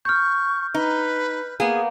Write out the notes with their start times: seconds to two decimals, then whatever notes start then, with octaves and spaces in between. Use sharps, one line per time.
0.05 C#6 F6 G6
0.74 D#4 B4
1.60 A#3 B3 G#4